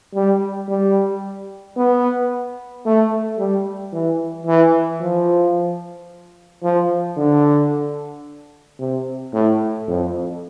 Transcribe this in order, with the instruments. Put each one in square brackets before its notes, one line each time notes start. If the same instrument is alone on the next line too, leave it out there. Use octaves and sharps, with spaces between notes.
[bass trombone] G3
G3
B3
A3
G3
E3
E3
F3
F3
D3
C3
A2
F2